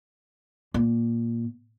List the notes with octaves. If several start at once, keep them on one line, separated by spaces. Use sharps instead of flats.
A#2